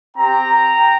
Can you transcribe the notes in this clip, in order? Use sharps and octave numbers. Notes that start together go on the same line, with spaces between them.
C4 G4 G5 A#5